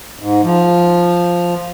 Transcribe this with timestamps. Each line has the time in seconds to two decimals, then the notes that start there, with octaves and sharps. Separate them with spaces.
0.19 G#2
0.43 F3